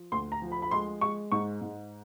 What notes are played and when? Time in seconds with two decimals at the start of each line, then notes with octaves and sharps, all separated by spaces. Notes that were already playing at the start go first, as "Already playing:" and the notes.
Already playing: F3
0.12 D2 C6
0.32 A#5
0.42 F3
0.52 B5
0.62 B5
0.71 G#3 C6
1.01 G#3 C#6
1.32 G#2 C#6
1.61 G#2